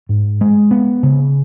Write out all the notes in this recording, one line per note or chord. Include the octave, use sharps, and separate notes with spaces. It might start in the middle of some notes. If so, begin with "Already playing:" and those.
G#2
G#3
B3
C#3